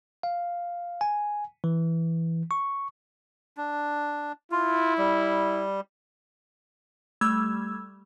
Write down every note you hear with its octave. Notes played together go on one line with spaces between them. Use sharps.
F5
G#5
E3
C#6
D4
E4 F4
G3
G3 A3 E6 G#6